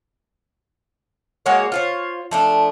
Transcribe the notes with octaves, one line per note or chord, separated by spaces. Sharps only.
G#3 A#3 F#4 C#5
F4 C5 C#5
F3 A3 D4